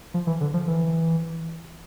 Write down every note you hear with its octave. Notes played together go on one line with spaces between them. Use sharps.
F3
E3
D3
F3
E3